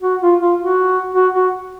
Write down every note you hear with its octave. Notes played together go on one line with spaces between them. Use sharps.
F#4
F4
F4
F#4
F#4
F#4